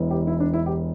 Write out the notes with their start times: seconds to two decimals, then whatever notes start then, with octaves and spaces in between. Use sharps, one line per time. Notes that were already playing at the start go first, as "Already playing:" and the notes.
Already playing: E1 E2 E3
0.10 G4
0.27 E4
0.40 D4
0.54 E4
0.66 G4